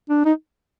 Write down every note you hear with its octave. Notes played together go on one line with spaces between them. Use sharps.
D4
D#4